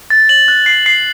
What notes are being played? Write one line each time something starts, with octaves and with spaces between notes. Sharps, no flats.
A6
F#7
F#6
C7
C7